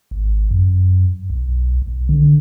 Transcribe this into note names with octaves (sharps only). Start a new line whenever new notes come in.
G#1
F#2
B1
B1
D3